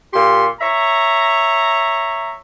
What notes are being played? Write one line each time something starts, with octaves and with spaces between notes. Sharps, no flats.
A#2 G4 C6
C#5 E5 A#5